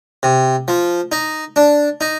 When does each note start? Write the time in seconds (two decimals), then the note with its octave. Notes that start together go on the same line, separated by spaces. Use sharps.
0.23 C3
0.68 F3
1.12 D#4
1.56 D4
2.01 D#4